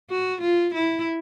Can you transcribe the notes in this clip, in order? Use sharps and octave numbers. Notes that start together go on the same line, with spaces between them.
F#4
F4
E4